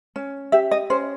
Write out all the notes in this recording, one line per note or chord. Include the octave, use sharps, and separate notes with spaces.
C#4
G4 E5
D#5
C#4 C5